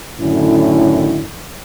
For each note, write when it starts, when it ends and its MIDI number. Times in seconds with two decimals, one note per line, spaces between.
0.20 1.27 42
0.20 1.27 45
0.20 1.27 50
0.20 1.27 51
0.20 1.27 61
0.20 1.27 64